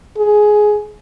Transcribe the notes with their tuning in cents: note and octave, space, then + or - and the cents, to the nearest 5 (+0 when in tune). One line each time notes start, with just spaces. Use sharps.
G#4 +10